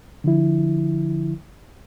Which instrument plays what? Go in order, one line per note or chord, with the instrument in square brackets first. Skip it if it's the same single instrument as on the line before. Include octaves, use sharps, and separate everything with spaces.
[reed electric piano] D3 F3 E4